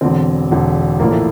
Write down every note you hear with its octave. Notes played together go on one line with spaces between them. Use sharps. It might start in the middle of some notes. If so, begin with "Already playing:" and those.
E1 E2 D3 C4
E1 E2 D3
A#1 A2 E3 A#3
A3